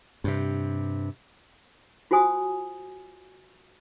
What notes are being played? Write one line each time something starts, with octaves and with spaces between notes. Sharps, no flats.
G2 C3
F4 F#4 C5 G#5 D#6